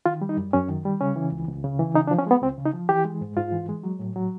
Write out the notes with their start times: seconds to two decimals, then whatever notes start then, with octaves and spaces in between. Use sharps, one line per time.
0.06 D#3 F4
0.21 G3
0.29 D#4
0.37 F#2
0.53 F#2 C#4
0.68 D#3
0.85 G3
1.01 C#3 C#4
1.16 E3
1.32 C#2
1.47 C#2
1.64 C#3
1.79 E3
1.95 C#3 D#4
2.07 D4
2.11 F3
2.18 C#4
2.27 G#3 B3
2.42 C#2 C4
2.58 C#3
2.65 D#4
2.73 F3
2.89 E3 G4
3.05 G#3
3.21 G#2
3.37 G#2 F4
3.52 E3
3.69 G#3
3.83 F#3
3.99 A2
4.16 F#3